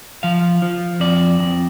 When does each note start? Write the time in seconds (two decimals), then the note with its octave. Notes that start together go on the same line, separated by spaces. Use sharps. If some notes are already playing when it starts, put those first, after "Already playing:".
0.23 F3 F5
0.62 F3
1.00 F2 D5
1.39 F2